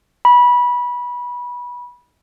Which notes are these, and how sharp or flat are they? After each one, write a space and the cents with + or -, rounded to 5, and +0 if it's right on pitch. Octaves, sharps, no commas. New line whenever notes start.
B5 -20